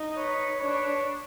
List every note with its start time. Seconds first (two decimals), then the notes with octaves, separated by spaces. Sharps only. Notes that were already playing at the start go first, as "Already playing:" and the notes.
Already playing: D#4
0.17 B4 C#5
0.60 D4 B4 C#5